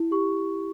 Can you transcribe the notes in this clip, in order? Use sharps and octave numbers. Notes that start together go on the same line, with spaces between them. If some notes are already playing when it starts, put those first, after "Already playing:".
Already playing: E4
G4 C#6